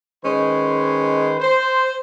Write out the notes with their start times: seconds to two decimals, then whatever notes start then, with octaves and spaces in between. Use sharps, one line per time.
0.22 D#3 G#3 C#4 B4 C5
1.40 C5